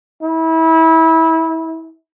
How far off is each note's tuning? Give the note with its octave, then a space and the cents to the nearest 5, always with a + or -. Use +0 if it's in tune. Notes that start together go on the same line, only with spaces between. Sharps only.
E4 -25